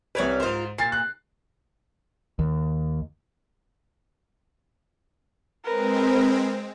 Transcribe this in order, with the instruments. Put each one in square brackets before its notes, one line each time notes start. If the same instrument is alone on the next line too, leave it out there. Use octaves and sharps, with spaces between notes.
[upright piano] C2 B4 [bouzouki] C#4 C#5 D5
[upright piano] G#2 C5 [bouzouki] F4 A#4
[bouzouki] A#2 [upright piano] A6 C7
[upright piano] F#6
[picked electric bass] D#2
[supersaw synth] G#3 C4 [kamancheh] A#4 B4